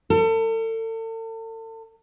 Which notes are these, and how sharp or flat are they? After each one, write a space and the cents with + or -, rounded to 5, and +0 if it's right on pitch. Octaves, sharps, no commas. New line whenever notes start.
A4 +40